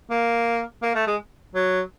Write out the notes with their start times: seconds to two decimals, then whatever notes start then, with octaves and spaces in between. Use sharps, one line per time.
0.11 A#3
0.83 A#3
0.95 A3
1.07 G#3
1.55 F#3